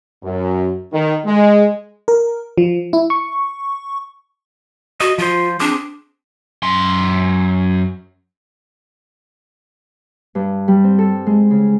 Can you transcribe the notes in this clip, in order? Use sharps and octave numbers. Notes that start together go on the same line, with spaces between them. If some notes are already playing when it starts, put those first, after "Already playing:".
F#2
D#3
G#3
A#4
F3
E4
C#6
F#4 D#5
F3 F4 C5
C4 D4 G#4 D6
F#2 C6
G2
G3
C4
A4
G#3
C#3